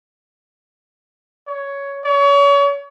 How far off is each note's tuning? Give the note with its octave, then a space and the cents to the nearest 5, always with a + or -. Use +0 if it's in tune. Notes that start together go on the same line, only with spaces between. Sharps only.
C#5 +10
C#5 +30